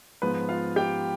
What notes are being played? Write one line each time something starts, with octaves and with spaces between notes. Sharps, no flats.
G#2 F3 B3 B4
F4 F5
G4 G5